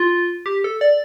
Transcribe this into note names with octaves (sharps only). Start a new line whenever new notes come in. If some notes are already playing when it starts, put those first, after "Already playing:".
Already playing: F4
G4
A4
D5